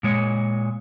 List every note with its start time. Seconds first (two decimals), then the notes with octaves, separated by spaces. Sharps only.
0.03 A#2 G#3 C#5